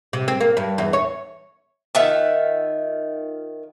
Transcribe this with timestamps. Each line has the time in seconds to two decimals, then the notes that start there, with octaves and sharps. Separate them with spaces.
0.13 C3
0.28 C4
0.40 A#3
0.57 G2
0.78 E2
0.93 C#5
1.95 D#3 F4 E5 F#5